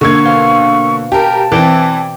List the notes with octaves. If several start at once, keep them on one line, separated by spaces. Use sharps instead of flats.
D3 A#3 C#6 G#6
B2 C5 F5
G4 A#4 A5
E3 C4 D5 G5